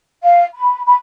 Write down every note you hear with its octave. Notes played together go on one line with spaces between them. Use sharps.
F5
B5
B5